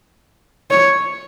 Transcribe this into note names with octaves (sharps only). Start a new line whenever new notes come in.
C#5